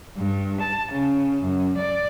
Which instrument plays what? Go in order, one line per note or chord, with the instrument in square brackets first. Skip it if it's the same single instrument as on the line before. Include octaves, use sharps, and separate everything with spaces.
[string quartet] G2
A5
C#3
F#2
D5